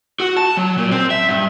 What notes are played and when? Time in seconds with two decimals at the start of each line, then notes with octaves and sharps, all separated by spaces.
0.20 F#4
0.37 A5
0.57 F#3
0.78 A#2
0.91 C4
1.10 E5
1.29 G2